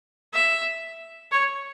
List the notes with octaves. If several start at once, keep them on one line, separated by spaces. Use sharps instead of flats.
E5
C#5